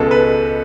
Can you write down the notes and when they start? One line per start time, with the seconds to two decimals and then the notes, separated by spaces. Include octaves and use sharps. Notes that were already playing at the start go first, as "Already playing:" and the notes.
Already playing: C#2 B2 G#3 A4 B4
0.11 B4